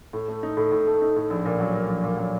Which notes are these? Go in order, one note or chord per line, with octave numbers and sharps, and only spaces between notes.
A2
A3
D#4
A2
A2
A3
D#4
A2
A#1
A#2
F#3
A#3
A#1
A#2
F#3